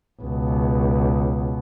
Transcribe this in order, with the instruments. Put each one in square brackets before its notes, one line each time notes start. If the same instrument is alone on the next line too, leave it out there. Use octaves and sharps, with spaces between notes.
[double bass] C#2 B2